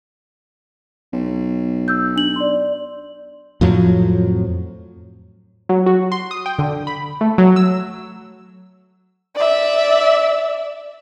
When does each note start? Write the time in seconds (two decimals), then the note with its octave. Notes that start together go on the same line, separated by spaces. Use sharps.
1.13 B1
1.88 E6 G6
2.16 D4 F#7
2.36 D5 C6
3.61 F2 A2 F3 F#3
5.69 F#3
5.86 F#4
6.12 C6
6.31 D#6
6.46 G5
6.59 D3
6.87 B5
7.21 A3
7.38 F#3
7.56 E6
9.36 D5 E5